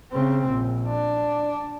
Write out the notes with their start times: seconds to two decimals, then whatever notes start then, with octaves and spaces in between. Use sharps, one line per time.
0.12 C#3 C4
0.48 A#1
0.88 D4